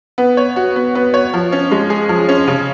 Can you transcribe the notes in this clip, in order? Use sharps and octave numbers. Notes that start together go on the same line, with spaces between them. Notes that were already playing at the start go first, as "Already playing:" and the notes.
B3
C#5
F#4
B3
B3
C#5
F3
C#4
G#3
G#4
F3
C#4
C#3